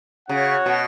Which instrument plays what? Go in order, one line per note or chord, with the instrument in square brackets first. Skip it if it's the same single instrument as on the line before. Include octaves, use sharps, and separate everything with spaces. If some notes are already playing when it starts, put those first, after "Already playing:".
[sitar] C#3 [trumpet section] C#4 F#4 C#5 F#5
[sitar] B2